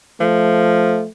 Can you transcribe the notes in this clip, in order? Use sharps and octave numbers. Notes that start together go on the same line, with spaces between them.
F3 A3